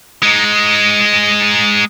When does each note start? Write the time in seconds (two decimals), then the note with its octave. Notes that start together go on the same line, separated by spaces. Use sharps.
0.23 G#3 D#4